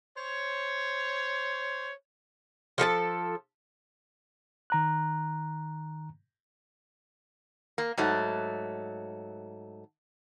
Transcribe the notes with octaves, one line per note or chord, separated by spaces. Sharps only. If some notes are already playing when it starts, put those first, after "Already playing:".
C5 C#5
F3 A4 A#4 A5
D#3 A#5 F#6
A#3
G#2 F#3 A3